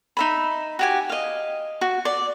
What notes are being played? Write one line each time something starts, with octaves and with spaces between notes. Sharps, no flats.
D#4 E5 B5
F#4 G4 G#5
D#5 F5
F#4
D5